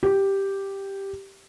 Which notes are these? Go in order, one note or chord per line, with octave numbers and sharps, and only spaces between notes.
G4